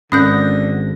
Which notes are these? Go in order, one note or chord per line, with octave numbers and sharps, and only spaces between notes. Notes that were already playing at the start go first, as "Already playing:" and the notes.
G#1 D3 C#4 D#6 F#6 G6 A#6